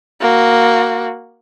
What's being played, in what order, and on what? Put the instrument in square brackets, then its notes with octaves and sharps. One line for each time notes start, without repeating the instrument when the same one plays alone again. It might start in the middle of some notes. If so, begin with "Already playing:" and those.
[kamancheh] A#3 F#4